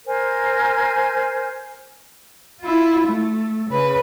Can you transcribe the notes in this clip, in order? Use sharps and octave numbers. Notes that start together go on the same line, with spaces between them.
A#4 C5 G#5
E4 F4
A3
C#3 B4